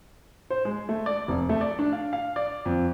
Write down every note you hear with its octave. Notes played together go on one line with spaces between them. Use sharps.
C5
G#3
A3
D5
F1
A3
D5
D4
F5
F5
D5
F2